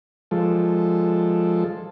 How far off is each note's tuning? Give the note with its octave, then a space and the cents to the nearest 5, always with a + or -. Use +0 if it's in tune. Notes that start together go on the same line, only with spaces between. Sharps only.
F3 +0 G#3 +0 A4 +0